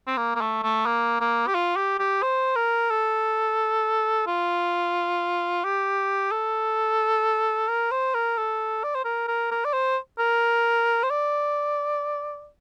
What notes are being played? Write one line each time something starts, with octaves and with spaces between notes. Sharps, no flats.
C4
A#3
A#3
A3
A3
A#3
A#3
G4
F4
G4
G4
C5
A#4
A4
F4
G4
A4
A#4
C5
A#4
A4
D5
C5
A#4
A#4
A#4
D5
C5
A#4
C5
D5